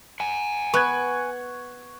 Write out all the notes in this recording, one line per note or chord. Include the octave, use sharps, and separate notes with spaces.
F#5 G#5
B3 C#6 F#6 G#6